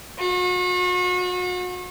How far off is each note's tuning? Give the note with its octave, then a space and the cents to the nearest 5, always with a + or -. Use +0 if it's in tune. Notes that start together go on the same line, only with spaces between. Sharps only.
F#4 -40